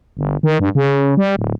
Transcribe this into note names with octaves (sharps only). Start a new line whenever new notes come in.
G1
D#3
G2
C#3
G3
D1